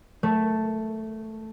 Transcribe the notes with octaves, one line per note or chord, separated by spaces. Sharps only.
A3